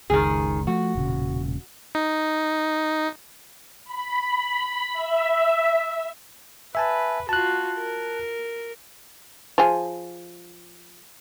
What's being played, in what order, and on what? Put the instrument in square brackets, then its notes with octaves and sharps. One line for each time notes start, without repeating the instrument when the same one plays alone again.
[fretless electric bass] F#1 C#2 [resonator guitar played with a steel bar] D#3 G#4
[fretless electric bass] F3 A3 [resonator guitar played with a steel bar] F#4
[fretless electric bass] E1 A#2 C#3
[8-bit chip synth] D#4
[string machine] B5
E5
[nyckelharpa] B4 [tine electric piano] E5 G#5 A5
[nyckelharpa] F4 F#4 [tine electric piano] A5 F#6
[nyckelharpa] A#4
[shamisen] F3 G#4